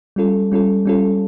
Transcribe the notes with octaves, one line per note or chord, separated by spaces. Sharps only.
G3 C#4 F4 A4
G3 C#4 F4 A4
G3 C#4 F4 A4